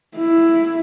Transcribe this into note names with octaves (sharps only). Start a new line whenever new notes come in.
E4